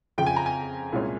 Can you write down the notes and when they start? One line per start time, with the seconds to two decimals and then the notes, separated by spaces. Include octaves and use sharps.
0.18 F2 C#3 F3 G5
0.26 G#5
0.36 A#5
0.46 G#5
0.92 C2 A#2 G#3 C#4